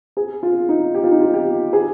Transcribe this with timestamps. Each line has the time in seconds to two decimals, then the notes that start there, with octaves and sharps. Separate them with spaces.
0.17 G#4
0.43 F4
0.69 D#4
0.94 G4
1.04 F4
1.11 D#4
1.20 F4
1.34 G4
1.73 G#4